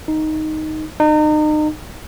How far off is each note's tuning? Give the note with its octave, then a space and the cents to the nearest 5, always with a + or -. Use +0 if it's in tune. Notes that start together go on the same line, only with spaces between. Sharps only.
D#4 +0
D#4 -35